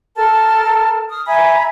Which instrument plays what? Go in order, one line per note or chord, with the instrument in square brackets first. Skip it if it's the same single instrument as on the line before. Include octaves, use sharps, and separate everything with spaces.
[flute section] A4 A#4 A5 F6
D#6 F6
E5 G#5 A#5 B5